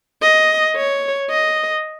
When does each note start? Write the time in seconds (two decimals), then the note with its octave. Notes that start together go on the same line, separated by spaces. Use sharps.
0.22 D#5
0.76 C#5
1.30 D#5